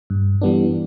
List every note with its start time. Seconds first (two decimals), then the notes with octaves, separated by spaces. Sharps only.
0.10 G2
0.41 E3 G3 B3 D4